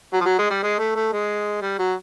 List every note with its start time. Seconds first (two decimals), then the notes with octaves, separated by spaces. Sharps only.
0.13 F#3
0.21 F3
0.25 F#3
0.39 G#3
0.50 G3
0.63 G#3
0.79 A3
0.95 A3
1.12 G#3
1.61 G3
1.79 F#3